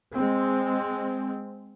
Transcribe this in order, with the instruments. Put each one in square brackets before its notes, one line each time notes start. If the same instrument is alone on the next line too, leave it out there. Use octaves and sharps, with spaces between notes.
[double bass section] G#3 C4